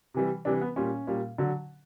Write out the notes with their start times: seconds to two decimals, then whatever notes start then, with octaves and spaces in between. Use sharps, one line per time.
0.14 C3 E3 G3
0.45 C3 E3 G3 D4
0.61 B3
0.76 A#2 G3 C#4
1.07 A#2 G3
1.38 D3 F#3